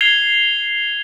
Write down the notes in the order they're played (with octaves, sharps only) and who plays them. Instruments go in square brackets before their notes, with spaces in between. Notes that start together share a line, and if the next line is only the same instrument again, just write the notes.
[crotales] G#6 C7 F7 G7